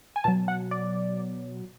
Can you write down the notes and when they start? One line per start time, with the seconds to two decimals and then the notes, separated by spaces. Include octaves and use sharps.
0.16 G#5
0.24 B2 F#3 A5
0.48 F#5
0.71 D5